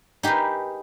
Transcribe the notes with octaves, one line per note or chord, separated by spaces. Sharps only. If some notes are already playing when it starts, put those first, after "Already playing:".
D#4 G4 G#4 A#4 B4